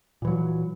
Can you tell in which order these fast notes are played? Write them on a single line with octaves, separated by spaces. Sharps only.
A#2 E3 F#3